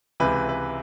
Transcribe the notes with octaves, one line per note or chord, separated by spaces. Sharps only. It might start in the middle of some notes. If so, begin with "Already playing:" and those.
C#2 C3 E3 B4
B4